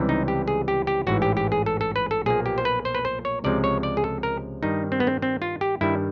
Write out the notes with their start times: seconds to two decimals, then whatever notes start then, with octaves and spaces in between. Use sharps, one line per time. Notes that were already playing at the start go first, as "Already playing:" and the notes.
Already playing: C#2 C3 E3 G3
0.09 D#4
0.28 G4
0.48 G#4
0.68 G4
0.87 G4
1.07 A1 G#2 E3 F#4
1.22 G4
1.37 G4
1.52 G#4
1.66 A4
1.81 A4
1.96 B4
2.11 A4
2.26 B1 A#2 F3 A#3 G#4
2.46 G4
2.58 C5
2.65 B4
2.85 C5
2.95 B4
3.05 C5
3.25 C#5
3.44 C#2 C3 F3 G#3 D5
3.64 C#5
3.83 D5
3.97 G#4
4.04 A4
4.23 A#4
4.63 G2 D#3 G3 D#4
4.92 C4
5.00 B3
5.07 C4
5.22 C4
5.42 F4
5.61 G4
5.81 G2 D#3 G3 E4